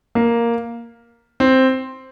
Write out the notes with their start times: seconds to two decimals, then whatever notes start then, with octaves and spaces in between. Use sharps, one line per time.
0.15 A#3
1.40 C4